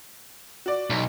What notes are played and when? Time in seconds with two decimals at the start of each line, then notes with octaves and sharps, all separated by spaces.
0.66 F#4 D5
0.90 B1